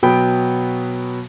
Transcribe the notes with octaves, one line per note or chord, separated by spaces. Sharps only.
B2 F#3 B3 G5 B5 D7